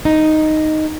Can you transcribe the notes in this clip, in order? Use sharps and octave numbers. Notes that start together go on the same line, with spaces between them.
D#4